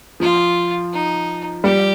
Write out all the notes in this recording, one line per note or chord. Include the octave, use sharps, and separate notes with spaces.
F3 F4
D#4
G3 G4